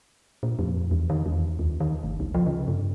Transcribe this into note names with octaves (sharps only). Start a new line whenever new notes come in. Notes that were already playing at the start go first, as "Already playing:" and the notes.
A#2
F2
E2
D#3
E2
D#2
D#3
G1
C#2
F3
C#3
G2